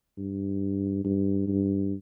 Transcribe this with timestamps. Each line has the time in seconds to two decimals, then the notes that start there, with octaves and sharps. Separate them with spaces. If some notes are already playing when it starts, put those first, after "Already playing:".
0.17 G2
1.04 G2
1.48 G2